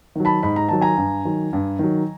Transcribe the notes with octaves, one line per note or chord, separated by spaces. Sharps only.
D#3 F#3
A5 B5
G#2 B5
A#5
D#3 F#3 A5
G#5 A#5
G2
D#3 F#3
G2
D#3 F#3